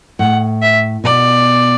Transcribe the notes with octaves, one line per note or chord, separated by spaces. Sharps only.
A2 F#5
E5
B2 D5